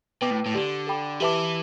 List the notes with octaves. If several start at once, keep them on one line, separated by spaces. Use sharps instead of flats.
B2 B4 G5 D6
A2
A2
D3 G4 D5 A5
A4 G5 B5 D6
E3 G4 B4 E5 A5 D6